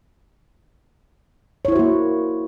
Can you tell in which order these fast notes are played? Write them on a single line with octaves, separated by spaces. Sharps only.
C#5 E4 C5 F#4 A#3